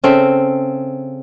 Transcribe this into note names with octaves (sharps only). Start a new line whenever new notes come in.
C#3 C4 A4 E5